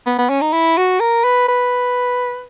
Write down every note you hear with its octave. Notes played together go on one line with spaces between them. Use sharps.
B3
B3
C#4
D#4
E4
F#4
A#4
B4
B4